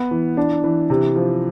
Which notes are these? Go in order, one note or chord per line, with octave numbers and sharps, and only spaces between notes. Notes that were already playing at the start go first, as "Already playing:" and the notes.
Already playing: B3
E3
D4
E3
C3
F3